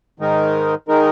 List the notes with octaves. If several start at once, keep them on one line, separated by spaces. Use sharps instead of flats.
G#2 D#3 G#3 D#4 A#4
D#3 G#3 D#4 A#4